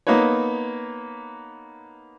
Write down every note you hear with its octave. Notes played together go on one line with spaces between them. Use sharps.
A#3 B3 D#4 B4 C#5